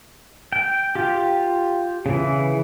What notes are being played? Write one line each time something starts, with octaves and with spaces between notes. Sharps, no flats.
G5
F4 G4
C#3 E3